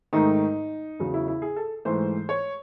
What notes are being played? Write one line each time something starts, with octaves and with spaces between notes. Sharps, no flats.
G#2 D#3 A3 D#4
E2 C#3 F#3
E4
E4
G#4
A4
G#2 E3 A3 C5
C#5